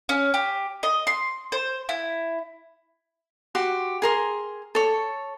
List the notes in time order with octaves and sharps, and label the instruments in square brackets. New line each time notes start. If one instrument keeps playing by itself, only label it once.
[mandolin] C#4
G4
D#5
C6
C5
E4
[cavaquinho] F#4 G4 C6
G#4 A#4 C6
A4 C#5